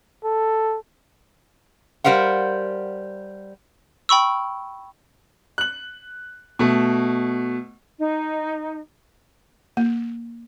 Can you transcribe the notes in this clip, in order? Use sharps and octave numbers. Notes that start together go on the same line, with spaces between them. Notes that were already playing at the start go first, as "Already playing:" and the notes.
A4
G3 A#4 C5 F5 F#5
G5 B5 C#6 E6
F#6 F#7
B2 A3
D#4
A#3